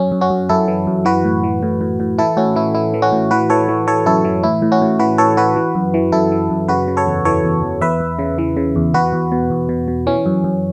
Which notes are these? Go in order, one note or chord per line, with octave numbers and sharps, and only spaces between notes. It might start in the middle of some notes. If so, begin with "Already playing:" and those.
Already playing: F#2 C#4
F#2
C#4 F#4
F#2
F#2 E4 A4
E3
F#2
E3 F#4 B4
A2
E3
A2
A2
A2
E3 E4 A4
A2 C#4 F#4
E3 E4
E3 E4
E3
C#4 F#4
A2
E3 F#4 B4
E3 A4 C#5
E3
E3 A4 C#5
F#2 E4 A4
E3
A2 E4
A2
C#4 F#4
A2
E3 F#4 B4
E3 A4 C#5
E3 F#4 B4
E3
F#2
E3
F#2 E4 A4
E3
F#2
C#3 F#4 B4
C#3
A4 C#5
E2
E3 A4 C#5
E2
E2
E2 B4 E5
E2
C#3
E3
C#3
E2
E2 F#4 B4
E2
B2
E2
B2
B2
E3 C#4
F#2
F#2